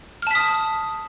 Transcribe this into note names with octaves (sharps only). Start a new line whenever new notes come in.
A5 D#6 F6 B6